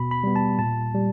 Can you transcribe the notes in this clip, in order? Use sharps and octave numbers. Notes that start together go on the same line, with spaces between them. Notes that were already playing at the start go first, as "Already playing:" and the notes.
Already playing: B2 B5
B5
G3 B3
A5
A#2 A5
G3